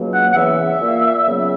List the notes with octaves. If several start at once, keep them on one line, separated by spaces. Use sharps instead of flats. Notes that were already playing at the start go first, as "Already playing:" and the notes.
Already playing: C#2 B2 F#3 A#3
F#5
F#5
E2 C#3 E3 B3 E5
A#2 A#3
C#2 C#3 F#3 B3